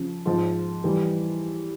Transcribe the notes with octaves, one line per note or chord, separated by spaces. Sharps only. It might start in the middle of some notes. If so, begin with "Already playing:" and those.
Already playing: C#3 F3
G#2 F3
E3 G3